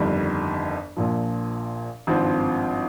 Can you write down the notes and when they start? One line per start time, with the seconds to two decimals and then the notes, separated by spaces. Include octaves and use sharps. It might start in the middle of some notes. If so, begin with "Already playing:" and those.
Already playing: G1 F2 D#3 G3
0.97 A#1 A#2 F3
2.07 G#1 G2 F3 C4